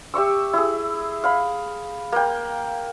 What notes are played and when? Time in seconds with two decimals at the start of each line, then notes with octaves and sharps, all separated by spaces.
0.14 G4 E5 C#6 E6
0.53 E4 G#4
1.24 F5 B5
2.12 A#3 G5